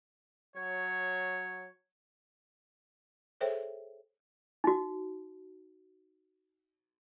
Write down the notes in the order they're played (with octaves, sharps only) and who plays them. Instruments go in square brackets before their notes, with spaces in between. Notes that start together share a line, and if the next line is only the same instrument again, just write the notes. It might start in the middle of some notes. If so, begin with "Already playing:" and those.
[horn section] F#3 C#5
[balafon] G#4 A4 C5 C#5 E5 G5
[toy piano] D#4 F#4